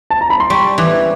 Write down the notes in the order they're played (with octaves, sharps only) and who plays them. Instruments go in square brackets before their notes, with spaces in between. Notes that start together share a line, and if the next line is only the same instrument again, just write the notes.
[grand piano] A5
A#5
B5
C6
[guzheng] G3 [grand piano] C#6
[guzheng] E3 [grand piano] D6